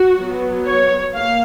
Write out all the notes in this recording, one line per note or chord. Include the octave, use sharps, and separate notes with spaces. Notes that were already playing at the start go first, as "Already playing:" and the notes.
Already playing: F#4
F#3 B3
C#5
A#3 F5